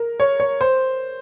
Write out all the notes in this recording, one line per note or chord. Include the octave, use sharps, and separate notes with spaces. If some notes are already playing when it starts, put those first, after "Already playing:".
Already playing: A#4
C#5
C#5
C5